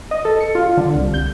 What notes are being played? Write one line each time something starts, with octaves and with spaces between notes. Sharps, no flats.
D#5
A4
C#7
F4
D3
C2
G6